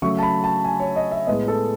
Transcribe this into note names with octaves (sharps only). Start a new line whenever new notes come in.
C#3 F#3 A3 C#6
A5
B5
A5
G#5
C#5
D#5
E5
A2 G#3 B3 D#5
A4